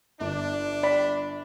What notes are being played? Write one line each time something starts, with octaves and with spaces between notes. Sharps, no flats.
G1 D4
D5 B5